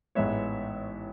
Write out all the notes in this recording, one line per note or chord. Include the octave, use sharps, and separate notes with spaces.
A1 G#2 G#3 B3 C#5 E5